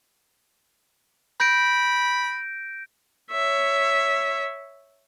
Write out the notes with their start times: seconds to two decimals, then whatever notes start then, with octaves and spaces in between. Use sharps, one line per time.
1.40 B5 G6 A#6 D7
3.31 C#5 E5